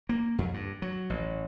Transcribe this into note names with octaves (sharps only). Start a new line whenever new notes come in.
A#3
F2
G2
F#3
A1